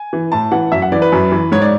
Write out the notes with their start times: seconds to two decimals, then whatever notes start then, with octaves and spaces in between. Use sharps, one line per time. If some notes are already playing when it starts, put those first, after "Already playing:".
Already playing: G#5
0.13 E3
0.32 A2 A5
0.52 E3 F#5
0.72 F#2 E5
0.82 F#5
0.92 E3 D5
1.02 B4
1.12 F#2
1.32 E3
1.52 G#2 C#5
1.62 D5